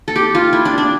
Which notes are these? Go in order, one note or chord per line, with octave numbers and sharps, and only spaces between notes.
A4
G4
F4
E4
D4
D4